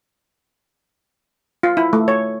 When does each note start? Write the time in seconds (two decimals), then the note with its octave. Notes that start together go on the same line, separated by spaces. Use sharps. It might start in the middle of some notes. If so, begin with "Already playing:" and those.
1.63 F4
1.77 E4
1.93 A3
2.08 C#5